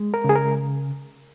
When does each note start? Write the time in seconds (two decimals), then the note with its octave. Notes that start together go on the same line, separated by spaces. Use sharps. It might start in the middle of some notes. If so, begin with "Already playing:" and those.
Already playing: G#3
0.14 A#4
0.24 C#3 G#4
0.35 A#4